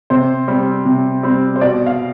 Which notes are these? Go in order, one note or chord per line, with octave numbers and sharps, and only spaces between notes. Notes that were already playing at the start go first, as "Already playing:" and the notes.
C3 C5
G3 C4
C3
G3 C4
C5
B2 D5
F5